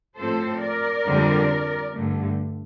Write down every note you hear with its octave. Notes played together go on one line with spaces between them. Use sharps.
A2 F3 C4 A4 C5
A#4 D5
F2 D3 G3 C4
G2 D3 A3